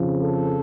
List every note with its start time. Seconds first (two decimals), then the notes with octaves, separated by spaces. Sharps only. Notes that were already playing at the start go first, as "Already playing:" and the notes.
Already playing: F2 C#3 F3
0.22 A4